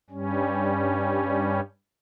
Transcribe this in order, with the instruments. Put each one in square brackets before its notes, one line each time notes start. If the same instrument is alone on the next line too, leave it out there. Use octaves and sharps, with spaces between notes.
[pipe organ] G2 G3 C#4